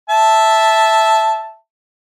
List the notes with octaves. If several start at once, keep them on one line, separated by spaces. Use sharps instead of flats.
E5 A5